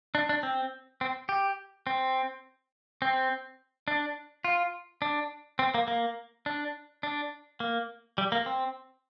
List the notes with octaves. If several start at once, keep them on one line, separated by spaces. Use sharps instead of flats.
D4
D4
C4
C4
G4
C4
C4
D4
F4
D4
C4
A#3
A#3
D4
D4
A#3
G3
A#3
C4